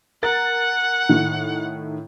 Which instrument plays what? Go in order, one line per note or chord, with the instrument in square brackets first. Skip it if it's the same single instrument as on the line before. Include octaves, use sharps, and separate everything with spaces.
[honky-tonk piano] A#4 A6 [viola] F#5
[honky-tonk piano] A2 D#3